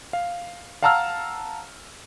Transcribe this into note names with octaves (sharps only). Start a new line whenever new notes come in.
F5
F5 F#5 A5 A#5 E6 F6